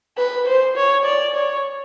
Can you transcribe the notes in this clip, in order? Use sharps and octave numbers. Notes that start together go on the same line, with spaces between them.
B4
C5
C#5
D5
C#5